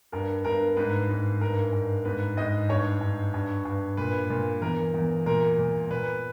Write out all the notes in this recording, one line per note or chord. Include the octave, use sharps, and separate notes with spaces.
G2 A#4
G2 A#4
G#2 B4
G#2
G2 A#4
G2
G#2 B4
G#2 D#5
G2 C#5
G2
G2
G2
A#2 B4
A#2
E2 A#4
E2
A#2 A#4
A#2
A#2 B4